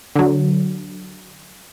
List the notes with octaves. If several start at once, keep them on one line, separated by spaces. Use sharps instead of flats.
D3 F#3